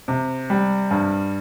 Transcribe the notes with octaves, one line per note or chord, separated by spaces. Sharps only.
C3
G3
G2